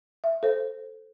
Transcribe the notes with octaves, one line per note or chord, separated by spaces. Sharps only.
E5
A4 C5